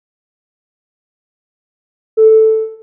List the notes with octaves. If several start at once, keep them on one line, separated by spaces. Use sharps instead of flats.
A4